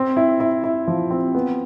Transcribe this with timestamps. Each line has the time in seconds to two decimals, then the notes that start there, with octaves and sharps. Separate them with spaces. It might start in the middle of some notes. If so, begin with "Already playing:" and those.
Already playing: C4
0.17 E4
0.40 E4
0.64 E4
0.88 F3
1.11 C4
1.35 B3